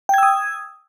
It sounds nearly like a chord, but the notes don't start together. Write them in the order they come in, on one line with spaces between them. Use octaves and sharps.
G5 G#6 E6 D#6